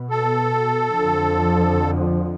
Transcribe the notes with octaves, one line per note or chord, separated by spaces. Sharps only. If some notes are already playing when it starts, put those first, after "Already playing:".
Already playing: B2 B3
A4
F2 D3 F3